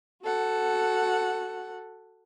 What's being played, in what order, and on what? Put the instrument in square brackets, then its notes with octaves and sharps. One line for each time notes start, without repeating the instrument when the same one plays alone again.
[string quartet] F#4 A4 F#5